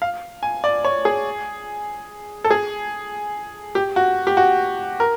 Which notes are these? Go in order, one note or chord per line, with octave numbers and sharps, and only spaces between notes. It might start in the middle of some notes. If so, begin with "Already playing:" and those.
F5
G#5
D5
C#5
G#4
A4
G#4
G4
F#4
G4
F#4
A#4